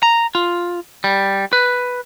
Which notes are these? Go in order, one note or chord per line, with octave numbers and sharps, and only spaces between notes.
A#5
F4
G3
B4